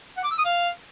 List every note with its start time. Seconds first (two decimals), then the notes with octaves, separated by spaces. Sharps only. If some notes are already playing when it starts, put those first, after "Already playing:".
0.17 F#5
0.24 D6
0.31 E6
0.38 D#6
0.45 F5